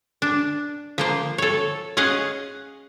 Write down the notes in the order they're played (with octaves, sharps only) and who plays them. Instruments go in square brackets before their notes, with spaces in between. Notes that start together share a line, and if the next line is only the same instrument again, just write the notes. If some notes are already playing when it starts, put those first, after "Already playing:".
[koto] D4
F3 A#3 C5
A4 C#5
C#4 G#4 D#5 F5 F#5